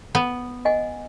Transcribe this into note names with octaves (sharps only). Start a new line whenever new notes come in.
B3
D#5 F#5 G#5